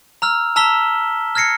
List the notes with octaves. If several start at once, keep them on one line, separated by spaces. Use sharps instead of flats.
A#5 E6 F6
A5 A#5 E6 B6 E7 G7
F6 G#6 A#6 C7 C#7